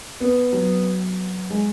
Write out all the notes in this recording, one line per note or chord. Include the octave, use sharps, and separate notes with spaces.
B3
F#3
G#3